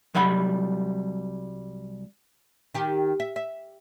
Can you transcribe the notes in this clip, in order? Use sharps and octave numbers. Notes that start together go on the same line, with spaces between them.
C2 F#3 G3 F#5 B5
D#3 G4
E5
E5